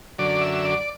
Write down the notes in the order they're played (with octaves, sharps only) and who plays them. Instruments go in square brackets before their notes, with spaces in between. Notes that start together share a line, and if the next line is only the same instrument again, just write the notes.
[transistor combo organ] F#2 D3 D5
E5
D5